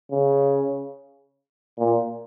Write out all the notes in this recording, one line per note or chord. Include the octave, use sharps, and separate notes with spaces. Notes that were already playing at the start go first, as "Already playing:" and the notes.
C#3
A#2